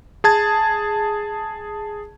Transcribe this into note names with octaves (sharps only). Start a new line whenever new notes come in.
G#4 A5 G#6